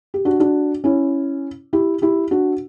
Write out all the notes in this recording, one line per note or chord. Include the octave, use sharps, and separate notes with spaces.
G4
D4 F#4
D4 F#4
C#4 E4
E4 G4
E4 G4
D4 F#4